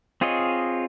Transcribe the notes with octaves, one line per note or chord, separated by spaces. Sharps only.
C4 F4 G#4 C#5 D#5